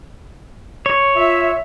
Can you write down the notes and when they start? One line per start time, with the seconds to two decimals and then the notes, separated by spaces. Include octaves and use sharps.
0.86 C#5
1.16 F4 E5